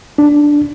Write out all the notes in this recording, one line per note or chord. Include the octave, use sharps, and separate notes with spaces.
D4